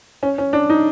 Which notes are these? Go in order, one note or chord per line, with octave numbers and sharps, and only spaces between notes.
C#4
C#4
D4
D#4